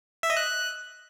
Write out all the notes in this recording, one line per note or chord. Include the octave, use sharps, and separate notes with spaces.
E5
D#5
F#6